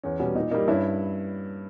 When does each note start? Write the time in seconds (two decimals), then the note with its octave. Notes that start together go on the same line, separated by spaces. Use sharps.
0.03 E2 C#4
0.19 B2 G3 C#4
0.35 A#2 D#4
0.51 G3 A#3 D#4
0.68 G2 C#4 E4